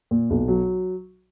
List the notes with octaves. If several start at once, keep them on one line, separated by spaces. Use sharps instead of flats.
A#2
B1
F#3